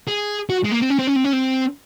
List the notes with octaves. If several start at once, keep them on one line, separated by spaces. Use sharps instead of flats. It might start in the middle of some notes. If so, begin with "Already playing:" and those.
G#4
F#4
G#3
A#3
C4
C#4
C4
C#4
C4
C#4
C4